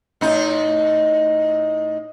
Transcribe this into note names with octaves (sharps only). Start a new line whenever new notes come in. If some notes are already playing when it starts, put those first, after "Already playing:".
A2 D#4